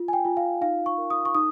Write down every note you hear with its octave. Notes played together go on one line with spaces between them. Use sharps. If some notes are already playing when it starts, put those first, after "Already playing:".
Already playing: F4
G#5
G5
F4
F5
D#4 F5
C#6
A#4
D#6
C#6
D#4 D#6